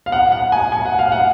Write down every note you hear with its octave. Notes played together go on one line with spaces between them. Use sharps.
F5
F#5
F#5
G#5
G#5
F#5
F5
F#5